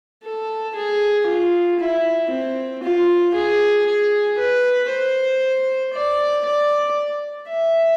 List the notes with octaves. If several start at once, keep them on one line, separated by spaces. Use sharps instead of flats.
A4
G#4
F4
E4
C4
F4
G#4
G#4
B4
C5
D5
D5
E5